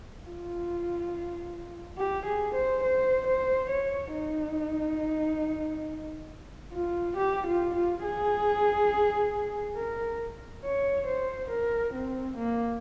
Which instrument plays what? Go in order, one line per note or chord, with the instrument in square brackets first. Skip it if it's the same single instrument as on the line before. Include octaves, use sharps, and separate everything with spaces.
[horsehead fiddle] F4
G4
G#4
C5
C5
C5
C#5
D#4
F4
G4
F4
F4
G#4
A#4
C#5
C5
A#4
C4
A#3